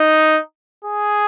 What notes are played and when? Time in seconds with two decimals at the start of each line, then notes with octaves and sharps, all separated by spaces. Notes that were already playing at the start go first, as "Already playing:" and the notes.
Already playing: D#4
0.85 G#4